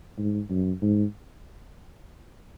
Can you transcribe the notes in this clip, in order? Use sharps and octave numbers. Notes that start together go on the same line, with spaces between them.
G#2
F#2
G#2